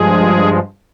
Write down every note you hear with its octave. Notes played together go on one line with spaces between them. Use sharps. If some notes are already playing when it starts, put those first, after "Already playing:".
Already playing: G2 F3 G#3 G#4